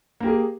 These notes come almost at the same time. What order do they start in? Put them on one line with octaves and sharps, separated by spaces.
A#3 G4 G#4